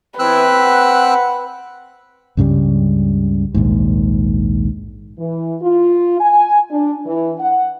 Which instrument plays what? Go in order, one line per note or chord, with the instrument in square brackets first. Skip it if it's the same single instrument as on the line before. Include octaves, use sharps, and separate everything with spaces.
[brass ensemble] E3 B3 E4 [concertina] C4 E6 F#6 [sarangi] B4
[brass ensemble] F#5
[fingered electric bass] C#2 G2 C#3 G3
A#1 D#2 G#2
[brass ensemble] E3
F4
G#5
D4
E3
F#5